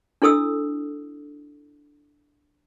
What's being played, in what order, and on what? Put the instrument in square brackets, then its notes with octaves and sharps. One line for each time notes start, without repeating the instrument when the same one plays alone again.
[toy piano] D4 E4 A4 D#6 E6